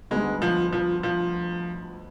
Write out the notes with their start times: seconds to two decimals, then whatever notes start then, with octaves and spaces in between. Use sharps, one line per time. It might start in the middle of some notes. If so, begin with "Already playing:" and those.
0.11 D2 D3 G3 G#3 B3 D#4
0.42 F3
0.73 F3
1.03 F3